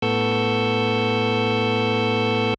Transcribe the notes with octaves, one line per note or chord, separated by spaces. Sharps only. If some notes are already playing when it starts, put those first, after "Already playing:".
A2 B3 A4 C#6 E6 G6